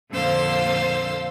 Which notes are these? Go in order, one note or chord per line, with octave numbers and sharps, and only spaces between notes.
F2 A#2 D3 C5 F5 E6